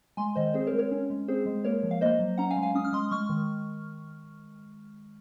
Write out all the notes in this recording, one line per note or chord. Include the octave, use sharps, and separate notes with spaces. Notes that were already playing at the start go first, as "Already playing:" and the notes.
G#3 G#5 C6
D#3 C5 D#5
C4 G#4 C5
A#4 C#5
G#3
A#4 C#5
C#4
G#3
C4 G#4 C5
G#3
A#3 A#4 C#5
F3
F5
A#3 C5 D#5
F#3
C#4 F#5 A#5
F5 G#5
G#3
F5 G#5
C#4 D#6
F6
G#3 C6 D#6
G#3 C#6 F6
D#3